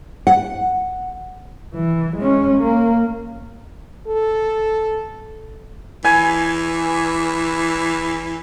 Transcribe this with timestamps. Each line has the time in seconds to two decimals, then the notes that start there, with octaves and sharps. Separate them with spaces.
0.27 F#5
1.74 E3
2.17 G#3 C#4
2.59 A#3
4.08 A4
6.05 E3 G#5